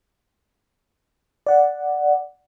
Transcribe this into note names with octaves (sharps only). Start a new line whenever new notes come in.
D5 F#5